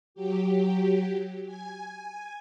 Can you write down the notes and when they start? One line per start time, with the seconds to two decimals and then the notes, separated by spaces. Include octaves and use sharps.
0.15 F#3 G4
1.46 G#5